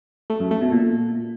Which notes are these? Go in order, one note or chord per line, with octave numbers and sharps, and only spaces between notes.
A3
F#2
A3
B2
A#2